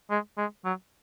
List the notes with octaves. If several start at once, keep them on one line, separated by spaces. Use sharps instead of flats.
G#3
G#3
F#3